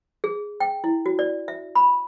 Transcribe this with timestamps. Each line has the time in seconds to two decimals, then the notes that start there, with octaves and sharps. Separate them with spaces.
0.24 G#4
0.60 G5
0.84 E4
1.06 F#4
1.19 D5
1.48 E5
1.75 B5